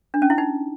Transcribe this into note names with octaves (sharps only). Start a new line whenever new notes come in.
D4
C#4
E4
D#4